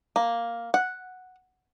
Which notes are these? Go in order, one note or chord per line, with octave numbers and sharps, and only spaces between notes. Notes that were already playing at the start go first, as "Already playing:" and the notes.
A#3
F#5